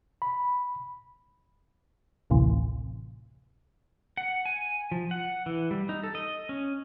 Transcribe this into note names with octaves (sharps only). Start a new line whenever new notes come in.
B5
A1 D2 A2 C3 E3
F#5
G#5
F3
F#5
E3
G3
D#4
A4
D#5
C#4